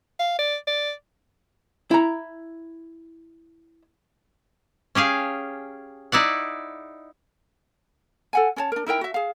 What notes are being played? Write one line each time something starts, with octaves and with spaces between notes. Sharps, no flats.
F5
D5
D5
E4 A#5
C#4 G4 G#4 F5
D#4 E4 D5 F#5
A4 F#5 G#5
C#4 B4 C#5 A5
D4 A#4
D#4 E4 A#4 G5
F#4 E5
G#4 F5